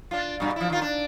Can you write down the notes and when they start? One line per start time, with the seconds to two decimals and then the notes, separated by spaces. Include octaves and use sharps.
0.11 D4 F4
0.40 G2 B2
0.56 F3 E4
0.70 D#3 F4
0.82 D4